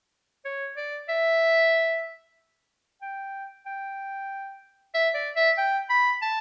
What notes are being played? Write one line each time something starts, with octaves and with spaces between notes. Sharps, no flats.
C#5
D5
E5
G5
G5
E5
D5
E5
G5
B5
A5